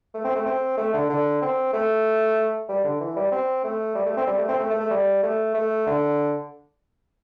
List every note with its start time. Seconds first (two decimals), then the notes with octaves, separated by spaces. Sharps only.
0.14 A3
0.24 C4
0.35 A3
0.46 C4
0.78 A3
0.94 D3
1.09 D3
1.42 C4
1.73 A3
2.69 G3
2.84 D3
3.00 E3
3.16 G3
3.32 C4
3.64 A3
3.95 G3
4.06 A3
4.17 C4
4.27 G3
4.38 A3
4.48 C4
4.59 A3
4.70 A3
4.80 A3
4.91 G3
5.23 A3
5.54 A3
5.86 D3